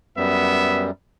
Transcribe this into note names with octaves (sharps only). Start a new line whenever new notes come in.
F#2 G3 B3 E5